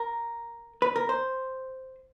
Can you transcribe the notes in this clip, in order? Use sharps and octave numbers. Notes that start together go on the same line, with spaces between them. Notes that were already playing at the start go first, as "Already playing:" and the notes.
Already playing: A#4
B4
A#4
C5